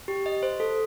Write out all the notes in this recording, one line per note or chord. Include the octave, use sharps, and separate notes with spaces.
G4
D#5
C5
A4